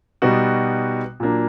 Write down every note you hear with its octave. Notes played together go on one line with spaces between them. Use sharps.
B2 G3 B3 D#4 F#4
A#2 F#3 A#3 D4